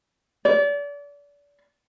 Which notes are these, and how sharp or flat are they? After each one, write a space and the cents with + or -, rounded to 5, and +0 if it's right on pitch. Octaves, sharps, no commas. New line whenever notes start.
D5 -35